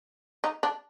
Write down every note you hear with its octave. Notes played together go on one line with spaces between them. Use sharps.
D#4
D4